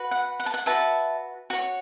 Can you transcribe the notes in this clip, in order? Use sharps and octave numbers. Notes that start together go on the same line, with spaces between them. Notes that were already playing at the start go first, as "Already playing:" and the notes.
Already playing: F#4 B4
F#5
F#5
A5
F#5
F#4 B4 E5 A5
F#4 C#5